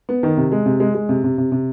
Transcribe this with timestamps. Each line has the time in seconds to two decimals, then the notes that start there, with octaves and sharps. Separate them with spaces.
0.09 B3
0.23 D#3
0.37 C3
0.52 G#3
0.65 C3
0.80 G#3
0.95 G#3
1.09 C3
1.24 C3
1.38 C3
1.52 C3